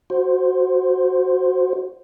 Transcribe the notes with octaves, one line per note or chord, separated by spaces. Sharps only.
F#4 C5